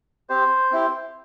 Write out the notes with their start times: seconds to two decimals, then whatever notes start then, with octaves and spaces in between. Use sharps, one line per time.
0.29 C4 G4 C5
0.71 C4 E4 G4